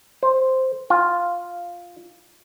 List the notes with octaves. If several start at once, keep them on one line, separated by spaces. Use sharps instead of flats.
C5
F4